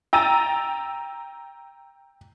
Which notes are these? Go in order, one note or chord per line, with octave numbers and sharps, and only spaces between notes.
G5 A#5 E6 A6 D#7